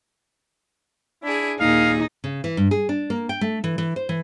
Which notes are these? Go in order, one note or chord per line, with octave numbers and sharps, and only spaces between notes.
D4 E4 G#4
D#2 A#2 D#4 G#4 F5
C#3
E3
G2
G#4
D4
A#3
G5
A3
E3
E3
C5
E3